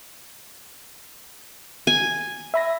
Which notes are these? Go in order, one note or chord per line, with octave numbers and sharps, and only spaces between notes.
G#5
E5 B5 A#6